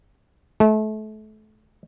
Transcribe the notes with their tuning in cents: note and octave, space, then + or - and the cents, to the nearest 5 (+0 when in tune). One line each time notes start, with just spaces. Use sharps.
A3 -30